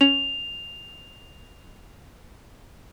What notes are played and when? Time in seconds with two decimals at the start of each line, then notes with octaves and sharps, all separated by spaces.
0.01 C#4 F7